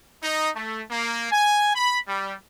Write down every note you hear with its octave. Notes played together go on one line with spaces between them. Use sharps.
D#4
A3
A#3
G#5
B5
G3